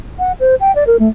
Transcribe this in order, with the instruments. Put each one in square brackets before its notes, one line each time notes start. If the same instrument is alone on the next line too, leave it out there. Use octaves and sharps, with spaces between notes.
[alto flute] F#5
C5
G5
D5
A#4
A3